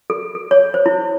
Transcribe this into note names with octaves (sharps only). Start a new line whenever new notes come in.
A4
A4
C#5
C5
E4